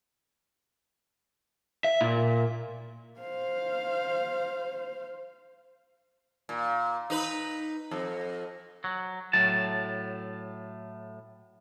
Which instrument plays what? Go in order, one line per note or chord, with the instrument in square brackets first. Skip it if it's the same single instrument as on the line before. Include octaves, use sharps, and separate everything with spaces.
[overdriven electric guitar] E5
A#2
[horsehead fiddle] C5 F5
[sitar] A#2
D#4 B4
F2
[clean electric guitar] F#3
A2 F#3 A5